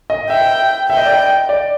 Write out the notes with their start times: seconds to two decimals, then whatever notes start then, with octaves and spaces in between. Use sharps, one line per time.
0.10 D#5
0.30 E5 G5
0.89 E5 G5
0.97 D#5
1.06 D5
1.14 D#5
1.49 D5